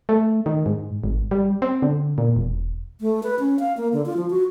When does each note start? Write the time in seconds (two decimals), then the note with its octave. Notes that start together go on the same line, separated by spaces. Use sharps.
0.09 A3
0.46 D#3
0.66 G#2
1.04 G#1
1.31 G3
1.62 C4
1.82 D3
2.18 A#2
2.36 E1
3.01 A3
3.23 B4
3.39 C#4
3.59 F5
3.77 A#3
3.93 D3
4.06 F4
4.17 F3
4.30 F#4